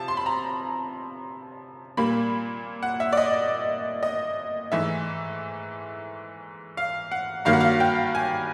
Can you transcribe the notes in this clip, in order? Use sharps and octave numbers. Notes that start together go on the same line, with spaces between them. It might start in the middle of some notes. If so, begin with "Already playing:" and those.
Already playing: C3 F3 A5
C6
B5
A#5
A#2 G3 A#3 B5
F#5
E5
D5
D#5
D#5
G#2 E3 A3 E5
F5
F#5
G2 D#3 F#3 A#3 F5
F#5
F5
G5
G#5